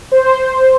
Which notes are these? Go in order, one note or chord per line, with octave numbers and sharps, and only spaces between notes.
C5